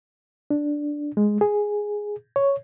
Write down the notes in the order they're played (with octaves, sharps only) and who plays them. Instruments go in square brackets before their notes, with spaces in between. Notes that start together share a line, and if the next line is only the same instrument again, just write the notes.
[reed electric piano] D4
G#3
G#4
C#5